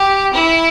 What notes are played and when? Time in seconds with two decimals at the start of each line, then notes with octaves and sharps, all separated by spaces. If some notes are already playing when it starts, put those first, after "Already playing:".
Already playing: G4
0.34 E4